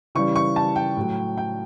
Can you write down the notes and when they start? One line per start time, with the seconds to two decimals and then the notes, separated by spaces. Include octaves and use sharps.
0.15 C#3 E3 G3 C#6
0.36 C#6
0.56 A5
0.76 G5
0.97 A2 F#3
1.38 G5